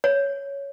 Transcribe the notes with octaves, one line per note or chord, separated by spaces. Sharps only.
C#5